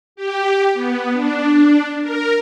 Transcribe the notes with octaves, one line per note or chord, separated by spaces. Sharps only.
G4
B3
D4
A#4